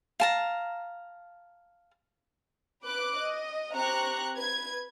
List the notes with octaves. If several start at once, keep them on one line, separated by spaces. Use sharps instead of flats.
F5 A5 A#5
B4 D6 F#6
D#5
C4 G4 A#5 C#6 F#6
B4 G#6